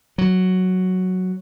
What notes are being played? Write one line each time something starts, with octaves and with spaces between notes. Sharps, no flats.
F#3